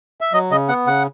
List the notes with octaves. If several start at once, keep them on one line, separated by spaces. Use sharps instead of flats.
E5
F#3 D#5
C#3 D#5
B3 F#5
C#3 F#5